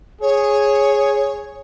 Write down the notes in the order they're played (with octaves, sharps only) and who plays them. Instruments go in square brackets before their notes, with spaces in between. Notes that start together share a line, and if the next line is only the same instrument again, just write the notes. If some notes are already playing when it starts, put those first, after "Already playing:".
[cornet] G#4 [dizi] C#5